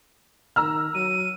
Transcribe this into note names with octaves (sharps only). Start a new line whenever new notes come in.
D#3 A#5 E6 F6
F#3 D#7